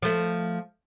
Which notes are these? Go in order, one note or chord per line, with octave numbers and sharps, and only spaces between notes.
F3 A3